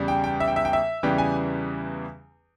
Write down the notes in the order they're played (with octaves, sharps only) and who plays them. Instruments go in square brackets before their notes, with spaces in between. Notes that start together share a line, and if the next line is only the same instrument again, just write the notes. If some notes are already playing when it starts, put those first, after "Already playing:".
Already playing: [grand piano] E2 C#3 G3
G5
G5
E5
G5
E5
G5
E5
E2 C#3 E3 G3 G5
G#5